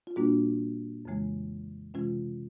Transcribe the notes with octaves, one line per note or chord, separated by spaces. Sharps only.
F4
A#2 G3 A#3 D4 F#4
F2 C#3 E3 G#3
C3 E3 G#3 C#4 F4